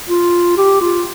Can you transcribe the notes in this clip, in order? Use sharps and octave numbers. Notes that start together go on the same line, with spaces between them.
F4
G4
F4